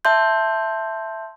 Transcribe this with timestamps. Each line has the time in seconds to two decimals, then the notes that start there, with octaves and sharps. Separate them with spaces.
0.05 E5 A5 C6 G6